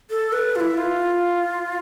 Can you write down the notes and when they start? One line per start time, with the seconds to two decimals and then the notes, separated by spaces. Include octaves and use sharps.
0.10 A4
0.33 B4
0.56 F4
0.60 E4
0.78 F4